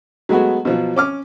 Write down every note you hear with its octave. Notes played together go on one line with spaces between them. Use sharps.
F#3 G#3 A3 B3 F#4
B2 F3 F#3
C#4 D6 F6